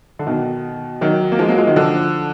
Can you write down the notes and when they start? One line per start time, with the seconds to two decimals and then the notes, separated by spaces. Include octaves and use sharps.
0.19 D3
0.27 B2 D#3
1.01 D#3 F#3
1.32 A#3
1.39 F3 G#3
1.48 F#3 A#3
1.58 F3 G#3
1.67 D#3 F#3
1.76 D3 F3